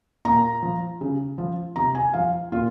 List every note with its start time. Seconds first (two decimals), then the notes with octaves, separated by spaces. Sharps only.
0.25 A#2 A#5
0.62 F3
1.01 C#3
1.38 F3
1.76 C3 A#5
1.95 G#5
2.13 F3 F5
2.52 A#2 F4